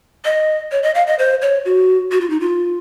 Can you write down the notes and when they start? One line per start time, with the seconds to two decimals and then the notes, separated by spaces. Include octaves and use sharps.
0.25 D#5
0.72 C#5
0.83 D#5
0.95 F5
1.07 D#5
1.19 C5
1.42 C#5
1.65 F#4
2.11 F#4
2.21 F4
2.30 D#4
2.40 F4